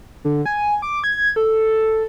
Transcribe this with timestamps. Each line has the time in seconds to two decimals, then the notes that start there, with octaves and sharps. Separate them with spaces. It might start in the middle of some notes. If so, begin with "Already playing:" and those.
0.25 D3
0.46 G#5
0.82 D6
1.04 G#6
1.36 A4